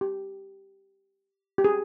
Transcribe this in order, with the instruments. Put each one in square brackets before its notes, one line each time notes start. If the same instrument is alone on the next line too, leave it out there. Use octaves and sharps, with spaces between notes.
[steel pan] G4
G4
G#4